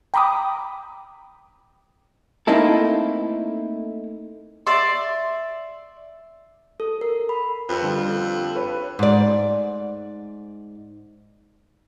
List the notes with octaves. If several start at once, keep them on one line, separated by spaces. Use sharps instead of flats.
G5 A#5 B5 D6 D#6
A3 A#3 C4 D#4 E4 A4
D5 E5 C6
A4
A#4
B5
F2 A4 B4
D3 G3
A4 B4 C#5
G#2 D5